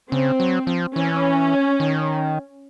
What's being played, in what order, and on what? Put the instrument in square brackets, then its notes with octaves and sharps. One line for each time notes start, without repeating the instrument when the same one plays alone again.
[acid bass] C#3 [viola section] C4
[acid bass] F#3
F3
[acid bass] E3 [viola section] C#4
[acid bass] D#3